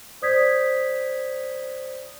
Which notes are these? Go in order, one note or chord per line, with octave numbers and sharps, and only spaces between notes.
C5 D5 D#6 G6 G#6 B6